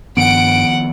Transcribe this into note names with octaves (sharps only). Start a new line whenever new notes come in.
G2 D#3 F3 B3 F#5 D7